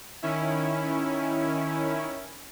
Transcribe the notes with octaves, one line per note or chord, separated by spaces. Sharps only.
D#3 C#4 E4